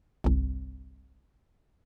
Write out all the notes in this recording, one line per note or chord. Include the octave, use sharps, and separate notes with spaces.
G1 C2